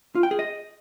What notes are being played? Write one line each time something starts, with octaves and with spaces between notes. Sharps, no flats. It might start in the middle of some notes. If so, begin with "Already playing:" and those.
F4
G5
G#4
D#5